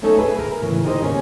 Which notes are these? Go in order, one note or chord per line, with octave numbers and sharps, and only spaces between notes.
F#3 A3 C#4 D#4 A4 C#5
G#4 B4 E5
A#4
A2 C#3 E3
D#4 G4 A#4 C5 C#5 D#5
D#2 C#3 C#4 C5 C#5